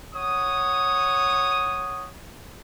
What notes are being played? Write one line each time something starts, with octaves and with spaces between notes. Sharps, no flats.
C#5 F#5 D#6